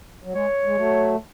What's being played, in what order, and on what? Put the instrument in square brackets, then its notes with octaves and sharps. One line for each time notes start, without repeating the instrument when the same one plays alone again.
[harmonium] F#3
[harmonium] G#3 [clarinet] C#5
[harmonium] G#3
F#3 A3